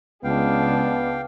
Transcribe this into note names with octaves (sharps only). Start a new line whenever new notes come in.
C#2 G#3 B3 D4 F5 G5